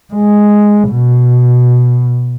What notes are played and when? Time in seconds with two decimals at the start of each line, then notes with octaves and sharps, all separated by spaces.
0.13 G#3
0.91 B2